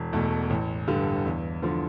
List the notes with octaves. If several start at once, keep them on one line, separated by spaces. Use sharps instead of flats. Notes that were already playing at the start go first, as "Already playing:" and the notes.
Already playing: E1
E2 B2 A3
A1
G2 D3 G3
E2
D3 F3